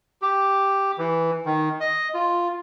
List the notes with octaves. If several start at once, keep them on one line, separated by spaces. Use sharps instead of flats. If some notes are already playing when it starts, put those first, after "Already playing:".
G4
E3
D#3
D#5
F4